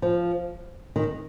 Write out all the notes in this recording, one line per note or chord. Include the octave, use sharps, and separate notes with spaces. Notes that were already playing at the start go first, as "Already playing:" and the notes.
F3
D#3